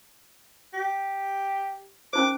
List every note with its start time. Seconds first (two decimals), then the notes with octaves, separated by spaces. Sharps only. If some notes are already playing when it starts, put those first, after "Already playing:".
0.74 G4
2.13 C#4 D#4 C5 D6